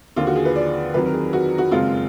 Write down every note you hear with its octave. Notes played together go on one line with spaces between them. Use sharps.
D#2 D3 F3 F4
F#4
G#4
B4
D5
F2 D#3 F#3 B4
A#4
G#4
F#4
F#4
F#1 F2 F3 G#3 F4